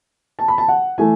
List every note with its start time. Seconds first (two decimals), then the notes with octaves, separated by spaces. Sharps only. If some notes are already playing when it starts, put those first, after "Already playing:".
0.39 A5
0.48 B5
0.58 A5
0.68 F#5
0.98 E3 A3 E4 G#5